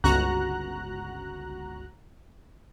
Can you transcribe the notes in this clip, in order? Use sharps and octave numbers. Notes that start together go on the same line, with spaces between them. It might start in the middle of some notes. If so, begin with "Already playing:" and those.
G1 C#2 F#4 A#5 F#6